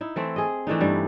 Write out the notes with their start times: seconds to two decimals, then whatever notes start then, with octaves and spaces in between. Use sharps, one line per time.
0.01 D#4 E4
0.16 E3 A3 C4
0.36 G#4 D#5
0.67 E3 A3 D4 D#4
0.81 G2 G3